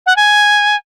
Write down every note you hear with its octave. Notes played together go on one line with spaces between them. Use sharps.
F#5
G#5